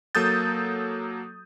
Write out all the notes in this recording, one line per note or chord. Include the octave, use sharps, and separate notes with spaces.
F#3 A#3 A4 D#6 G6 A6